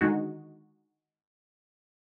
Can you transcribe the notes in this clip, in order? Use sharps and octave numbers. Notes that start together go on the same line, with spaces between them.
D3 D#3 G#3 D#4 F#4